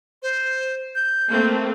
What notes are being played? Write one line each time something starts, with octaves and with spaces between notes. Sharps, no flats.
C5
G6
A3 A#3 C4